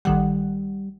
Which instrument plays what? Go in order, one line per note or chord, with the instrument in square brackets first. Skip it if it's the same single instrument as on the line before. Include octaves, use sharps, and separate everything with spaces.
[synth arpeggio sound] A1 D#3 F#5 [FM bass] G3